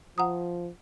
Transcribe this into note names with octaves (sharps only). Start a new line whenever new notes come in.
F3 F#5 A#5 D#6